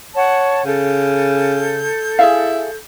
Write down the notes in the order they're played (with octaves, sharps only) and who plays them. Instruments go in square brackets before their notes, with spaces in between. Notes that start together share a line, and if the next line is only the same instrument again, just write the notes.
[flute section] C#5 F#5 A5
[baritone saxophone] C#3 [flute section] A4 G6
[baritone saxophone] E4 [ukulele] G#4 E5 F5